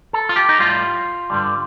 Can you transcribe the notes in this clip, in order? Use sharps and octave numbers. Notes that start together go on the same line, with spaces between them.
A4
F4
G4
D#4
A2 G3 F4
G2 D3 G3